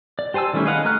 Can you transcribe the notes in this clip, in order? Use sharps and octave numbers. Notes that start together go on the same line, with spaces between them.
D5
G4 C5 G#5 A5 E6
D#3 G3 A3 C#4 E4
G#4 B4 D#5 F5 F#5
A3 F#4 A#5 F6 F#6